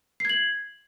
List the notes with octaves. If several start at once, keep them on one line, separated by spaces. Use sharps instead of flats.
G#6 C7 F#7